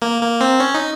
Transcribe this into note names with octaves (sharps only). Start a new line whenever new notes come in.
A#3
A#3
C4
C#4
D#4